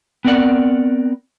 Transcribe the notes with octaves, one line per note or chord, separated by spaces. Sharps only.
B3 C4 A#4 D5 F#5